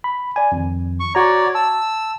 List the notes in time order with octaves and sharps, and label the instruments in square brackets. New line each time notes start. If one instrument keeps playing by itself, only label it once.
[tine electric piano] B5
D5 G#5
F2 D#3
[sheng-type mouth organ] C#6
[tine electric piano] F#4 A#5 [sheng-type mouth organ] C#5 D5
[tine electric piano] A5 [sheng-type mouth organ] E6